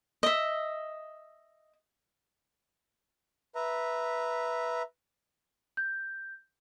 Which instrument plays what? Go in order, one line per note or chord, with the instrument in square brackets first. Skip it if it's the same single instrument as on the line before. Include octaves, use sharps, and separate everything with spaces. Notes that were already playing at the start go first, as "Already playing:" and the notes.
[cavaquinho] D#5 E5
[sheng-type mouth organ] B4 E5 A#5
[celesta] G6